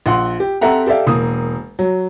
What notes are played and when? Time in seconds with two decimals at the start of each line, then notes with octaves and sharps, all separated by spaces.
0.06 A#1 F#5 C6
0.40 G4
0.61 C4 G4 A4 E5 F#5 A#5
0.86 G4 A4 D5 E5 F5
1.07 E1 A#3 D#6
1.79 F#3